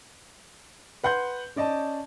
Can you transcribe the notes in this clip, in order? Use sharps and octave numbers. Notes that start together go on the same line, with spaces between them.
B4 F#5 C6 G6
C#4 D5 D#5 A5